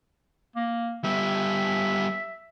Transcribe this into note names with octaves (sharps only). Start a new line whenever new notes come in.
A#3
G3 B3 E5